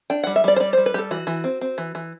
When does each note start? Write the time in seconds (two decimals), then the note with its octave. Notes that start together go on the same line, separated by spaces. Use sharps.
0.10 D4 G5
0.24 G3 F#5
0.36 E5
0.44 G3 D5
0.56 C5
0.60 G3 D5
0.73 G3 C5
0.86 B4
0.94 G3 G4 A4
1.11 E3 F#4
1.27 E3
1.44 C4
1.61 C4
1.78 E3
1.95 E3